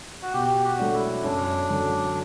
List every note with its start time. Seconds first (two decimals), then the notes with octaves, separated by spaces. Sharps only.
0.22 F#4
0.33 B2 G4
0.64 F#4
0.79 F#3 A3 D4
0.94 E4
1.24 F#2 D4
1.69 D3 F#3